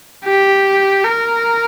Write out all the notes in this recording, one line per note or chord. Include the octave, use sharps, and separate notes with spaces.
G4
A#4